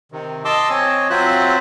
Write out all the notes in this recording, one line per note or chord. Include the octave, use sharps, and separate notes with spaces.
C3 D#3
D#5 A5 C6 D6 E6
C4 C#5 D#5 G#5
F#3 C4 F4 C5 E5 F#6